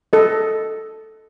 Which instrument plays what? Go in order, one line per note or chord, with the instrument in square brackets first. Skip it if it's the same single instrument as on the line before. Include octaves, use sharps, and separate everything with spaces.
[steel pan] A4 D#5